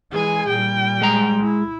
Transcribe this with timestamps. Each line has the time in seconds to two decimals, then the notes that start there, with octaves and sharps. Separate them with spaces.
0.12 E3 G#3 G#4 G#5
0.49 A#2 G3 G5
1.02 G#3 A#5
1.42 E4